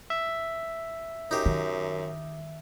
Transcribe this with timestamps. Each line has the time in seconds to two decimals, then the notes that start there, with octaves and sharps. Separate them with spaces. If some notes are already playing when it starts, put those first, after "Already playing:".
0.10 E5
1.31 F#2 D#4 G4
1.46 D#3